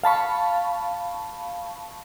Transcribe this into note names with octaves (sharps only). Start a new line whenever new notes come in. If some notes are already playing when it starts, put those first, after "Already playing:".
F5 A5 B5 C#6